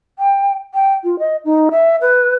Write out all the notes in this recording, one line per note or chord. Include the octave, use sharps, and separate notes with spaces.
G5
G5
F4
D#5
D#4
E5
B4